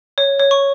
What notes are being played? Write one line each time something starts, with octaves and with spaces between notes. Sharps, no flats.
C#5
C#5
C#6